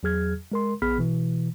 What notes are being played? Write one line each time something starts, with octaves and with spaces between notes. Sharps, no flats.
E2 F#3 G#4 F6 G#6
G#3 A#4 C6
A#1 B3 G#4 B5 F6 B6
B2 E3